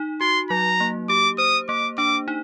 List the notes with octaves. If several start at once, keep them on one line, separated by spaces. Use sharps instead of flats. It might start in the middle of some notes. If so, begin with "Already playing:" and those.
Already playing: D#4
F#4 C6
F#3 A#5
A#3
G4 D6
C5 D#6
A#3 D6
D4 D6
D#4